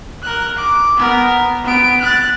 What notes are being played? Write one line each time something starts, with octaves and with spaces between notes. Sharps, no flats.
A#4 F#6
D6
B3 A#4
B3 D7
F#6 A6